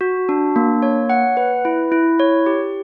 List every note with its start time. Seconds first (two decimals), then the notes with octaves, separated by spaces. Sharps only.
0.01 F#4
0.29 D4
0.56 A#3
0.82 C#5
1.10 F#5
1.37 B4
1.65 E4
1.92 E4
2.19 C#5
2.46 G4